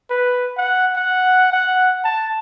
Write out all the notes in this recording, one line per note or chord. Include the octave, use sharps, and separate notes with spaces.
B4
F#5
F#5
F#5
A5